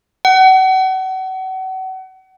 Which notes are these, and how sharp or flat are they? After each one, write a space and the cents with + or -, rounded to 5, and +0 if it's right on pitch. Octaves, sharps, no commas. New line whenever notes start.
F#5 +35